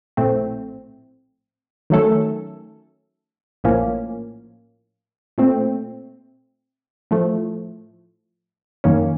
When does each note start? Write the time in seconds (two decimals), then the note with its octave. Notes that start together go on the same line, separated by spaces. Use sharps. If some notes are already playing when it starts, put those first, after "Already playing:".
0.17 A#1 A2 A3 C4
1.90 D#3 F#3 A3 C#4 A4
3.64 A#1 A2 F3 A#3 C#4
5.38 A#2 A3 C4
7.11 A2 F3 A3
8.84 F#2 D#3 A#3 C#4